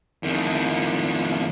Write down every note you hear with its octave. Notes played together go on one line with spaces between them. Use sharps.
F2 D#3